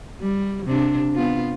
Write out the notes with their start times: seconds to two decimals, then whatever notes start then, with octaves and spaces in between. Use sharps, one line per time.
0.20 G3
0.66 C3 D4
1.15 B3 F4